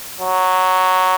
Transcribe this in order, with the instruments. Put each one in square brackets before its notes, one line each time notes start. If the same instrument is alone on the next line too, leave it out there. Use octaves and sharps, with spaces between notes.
[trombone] F#3